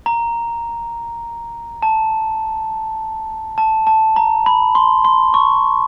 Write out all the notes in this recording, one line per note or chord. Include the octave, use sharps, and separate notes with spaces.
A#5
A5
A5
A5
A#5
B5
C6
C6
C#6